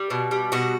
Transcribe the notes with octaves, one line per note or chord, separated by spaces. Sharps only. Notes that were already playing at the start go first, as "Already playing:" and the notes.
Already playing: G3
B2
G3
B2 F#4